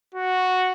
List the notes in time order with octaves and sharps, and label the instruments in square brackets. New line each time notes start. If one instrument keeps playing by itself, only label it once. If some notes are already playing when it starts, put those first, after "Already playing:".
[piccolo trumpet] F#4